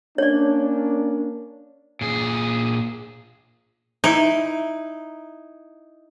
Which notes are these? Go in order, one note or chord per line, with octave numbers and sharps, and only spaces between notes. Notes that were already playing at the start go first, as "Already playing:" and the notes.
A#3 C#4 D4 C#5 D5
A#2 G#4
D#4 E4